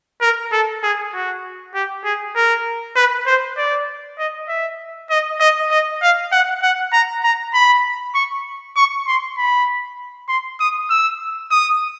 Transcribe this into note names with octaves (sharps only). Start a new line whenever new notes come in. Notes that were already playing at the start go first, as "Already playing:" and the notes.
A#4
A4
G#4
F#4
G4
G#4
A#4
B4
C5
D5
D#5
E5
D#5
D#5
D#5
F5
F#5
F#5
A#5
A#5
B5
C#6
C#6
C6
B5
C6
D#6
E6
D#6